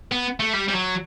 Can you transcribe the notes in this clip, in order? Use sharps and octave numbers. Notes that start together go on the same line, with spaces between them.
B3
A3
G3
G3
F#3